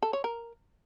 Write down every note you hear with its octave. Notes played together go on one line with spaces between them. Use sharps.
A4
C#5
A#4